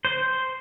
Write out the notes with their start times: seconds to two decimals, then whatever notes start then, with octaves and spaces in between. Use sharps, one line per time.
0.05 C5